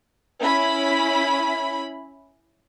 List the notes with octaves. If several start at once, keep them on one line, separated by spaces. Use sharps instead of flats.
C#4 E4 B5 B6